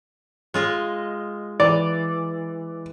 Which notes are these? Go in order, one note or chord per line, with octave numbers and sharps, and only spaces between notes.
G#3 F4 D#5
E3 D5